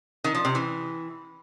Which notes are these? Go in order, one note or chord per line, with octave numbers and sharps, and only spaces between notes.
D#3
F3
C3
E3